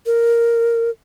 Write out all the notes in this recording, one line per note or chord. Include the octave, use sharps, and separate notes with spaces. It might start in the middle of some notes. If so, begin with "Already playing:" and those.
A#4